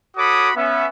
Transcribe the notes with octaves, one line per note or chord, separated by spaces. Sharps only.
F#4 A4 C#5 B5 D6 D#6
B3 C#4 E5